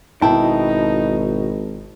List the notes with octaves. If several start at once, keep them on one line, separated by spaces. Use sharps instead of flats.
G#1 B2 D#4 E4 G5 A5